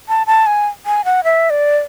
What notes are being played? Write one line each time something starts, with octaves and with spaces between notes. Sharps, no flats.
A5
A5
G#5
G#5
F#5
E5
D5